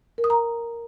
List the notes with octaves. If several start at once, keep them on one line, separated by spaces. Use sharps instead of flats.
A#4
D#6
A#5